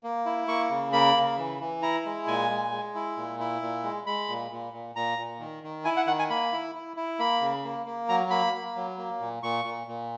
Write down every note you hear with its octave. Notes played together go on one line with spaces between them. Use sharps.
A#3
E4
A#3 C#6
C#3
A#3 B5
C#3
E3
E3
E4 A#5
G#3
A#2 G#5
G#3
G#3
E4
A#2
E4
A#2
G#3
G#3 B5
A#2
A#2
A#2
A#2 A#5
A#2
D#3
D#3
E4 G#5
F#5
D#3 F#5
G#5
A#3 B5
E4
E4
E4
A#3 B5
C#3
A#3
A#3
F#3 A#5
A#3 B5
A#3
F#3
A#3
A#2
A#2 C#6
A#2
A#2